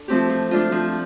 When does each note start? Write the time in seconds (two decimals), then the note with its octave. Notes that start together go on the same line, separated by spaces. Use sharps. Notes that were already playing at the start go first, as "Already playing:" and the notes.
Already playing: D4 A4
0.08 F3 A3 C4 G4
0.29 F3
0.51 A3 D4 F4
0.72 F3